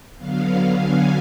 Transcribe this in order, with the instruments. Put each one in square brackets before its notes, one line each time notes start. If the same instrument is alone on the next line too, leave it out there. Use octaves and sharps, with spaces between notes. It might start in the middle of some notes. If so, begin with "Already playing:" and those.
[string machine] D3 F#3 B3 F5
G#5